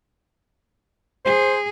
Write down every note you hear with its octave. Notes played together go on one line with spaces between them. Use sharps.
G#4 C5